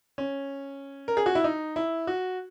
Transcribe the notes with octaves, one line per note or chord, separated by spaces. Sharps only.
C#4
A#4
G#4
F#4
E4
D#4
E4
F#4